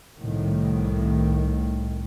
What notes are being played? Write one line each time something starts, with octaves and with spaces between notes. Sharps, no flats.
C2 A2 D#3